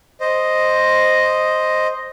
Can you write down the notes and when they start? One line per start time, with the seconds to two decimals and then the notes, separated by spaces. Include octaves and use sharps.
0.20 C5 D#5